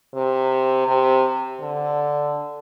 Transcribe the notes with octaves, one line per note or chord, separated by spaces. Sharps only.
C3
C3
D3